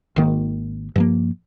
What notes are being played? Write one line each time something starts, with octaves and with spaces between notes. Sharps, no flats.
G#1 D#3 A#3
G2 F3 A#3